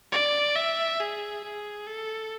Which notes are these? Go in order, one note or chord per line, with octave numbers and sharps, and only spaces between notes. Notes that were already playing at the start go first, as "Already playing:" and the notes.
D5
E5
G#4
G#4
A4